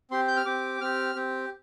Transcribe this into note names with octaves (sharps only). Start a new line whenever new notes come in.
C4 G4 C6
G6
F6
C4 G4 D6
C4 G4 F6
C4 G4